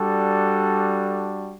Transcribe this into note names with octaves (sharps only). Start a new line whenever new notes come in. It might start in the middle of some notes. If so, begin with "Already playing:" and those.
Already playing: G3 D4 F#4 A4